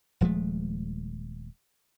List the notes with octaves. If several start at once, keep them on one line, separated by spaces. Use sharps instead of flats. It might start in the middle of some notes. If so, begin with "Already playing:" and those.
D#1 F3 G#3 A3